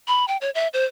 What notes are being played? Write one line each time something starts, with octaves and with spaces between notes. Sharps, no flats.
B5
G5
C#5
E5
C5